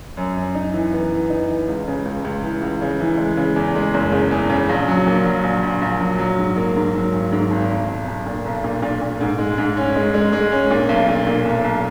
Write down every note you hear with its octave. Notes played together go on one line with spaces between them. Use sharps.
F#2
F#2
D#4
E3
B3
E3
D#4
E3
C#2
C#3
C#2
C#2
E3
C#2
C#3
E3
G#3
C#3
E2
G#3
F#1
C#3
E2
C#3
A#1
F#3
A#2
F#3
A#1
A#1
A#1
F#3
F#3
G#2
A#3
G#2
F#3
G#1
G#2
G#1
B1
B1
B1
A#2
B1
A#2
A#2
A#2
G#2
G#3
G#2
C#4
G#3
G#3
G#3
C#4
A#2
B1
A#2
A#2
B1
B1